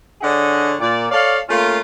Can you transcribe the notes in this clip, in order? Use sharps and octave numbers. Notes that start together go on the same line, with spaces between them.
D3 D4 G#4 C#5 D#5 F#5
A#2 D5
A4 C#5 D5 F5
A3 A#3 C#4 F4